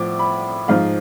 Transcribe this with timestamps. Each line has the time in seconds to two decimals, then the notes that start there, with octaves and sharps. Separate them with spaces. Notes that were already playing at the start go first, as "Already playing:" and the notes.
Already playing: A2 F3 D6
0.19 B5
0.68 G#2 F3 F5